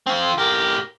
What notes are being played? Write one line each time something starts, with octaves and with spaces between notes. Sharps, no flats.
C4 F4
A2 G4 A#4